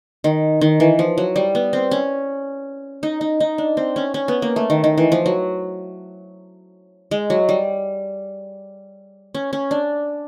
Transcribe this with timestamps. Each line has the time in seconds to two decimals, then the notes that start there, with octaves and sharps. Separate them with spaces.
0.24 D#3
0.61 D#3
0.80 E3
0.99 F3
1.18 F#3
1.36 G3
1.55 B3
1.73 C4
1.91 C#4
3.03 D#4
3.21 D#4
3.40 D#4
3.58 D4
3.77 C4
3.96 C#4
4.14 C#4
4.28 B3
4.42 A#3
4.56 A3
4.70 D#3
4.84 D#3
4.98 E3
5.12 F3
5.26 F#3
7.11 G#3
7.30 F#3
7.49 G3
9.35 C#4
9.53 C#4
9.71 D4